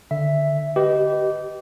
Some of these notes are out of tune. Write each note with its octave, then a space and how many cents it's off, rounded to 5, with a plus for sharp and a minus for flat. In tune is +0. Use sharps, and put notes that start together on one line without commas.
D3 +0 E5 +0
G4 -20 B4 +0 D#5 +0